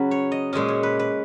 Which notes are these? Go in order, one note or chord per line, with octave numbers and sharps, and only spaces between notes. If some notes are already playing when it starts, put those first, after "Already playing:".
Already playing: C#3 F#3 C#4 B4
C#5
D#5
A#2 G#3 C#4 D#5
C#5
B4
B4